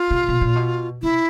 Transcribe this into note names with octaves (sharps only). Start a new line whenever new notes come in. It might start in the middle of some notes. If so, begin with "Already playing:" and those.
Already playing: F4
C3
B2
A#2
B2
C3 E4